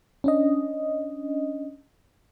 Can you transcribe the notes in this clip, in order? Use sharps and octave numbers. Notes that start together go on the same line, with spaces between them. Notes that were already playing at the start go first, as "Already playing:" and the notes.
C#4 D4 D#5